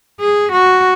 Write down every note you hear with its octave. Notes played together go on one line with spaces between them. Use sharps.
G#4
F#4